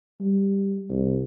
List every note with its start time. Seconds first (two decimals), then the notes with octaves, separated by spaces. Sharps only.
0.21 G3
0.90 C2